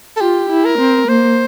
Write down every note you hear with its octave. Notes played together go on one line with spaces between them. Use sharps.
A4
F4 G4
E4
A#4
C4
A#3 C5